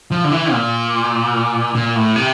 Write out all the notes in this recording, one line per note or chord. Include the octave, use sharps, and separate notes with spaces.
F3
D3
E3
A#2
A#2
A2
C3